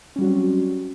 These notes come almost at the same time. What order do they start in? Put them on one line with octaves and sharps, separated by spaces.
C#4 G3 F#4 F#3 C4